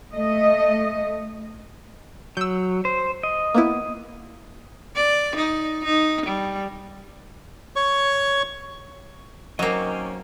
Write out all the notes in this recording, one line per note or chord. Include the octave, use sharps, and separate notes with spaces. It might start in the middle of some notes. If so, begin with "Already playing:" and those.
A3 D#5
F#3 E6 G6
C5
D#5
A#3 B3 E4
D5
D#4
D#4
G3
C#5 C#6
D#3 F#3 A#3 C4 C#4 C#5 D#5